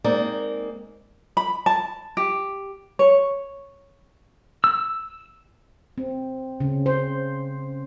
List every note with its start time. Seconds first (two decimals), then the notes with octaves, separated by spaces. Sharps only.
0.04 G#3 A#3 C4 D#4 A#4 D5
1.37 B5
1.66 A5
2.17 G4
2.99 C#5
4.64 E6
5.98 C4
6.60 C#3
6.86 C5